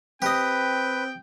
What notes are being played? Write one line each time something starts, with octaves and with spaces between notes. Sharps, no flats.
C4 G4 B4 D#5 G5